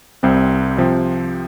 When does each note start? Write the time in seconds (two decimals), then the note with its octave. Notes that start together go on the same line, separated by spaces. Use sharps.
0.23 C2 C3 G3 C4
0.78 C3 F3 C4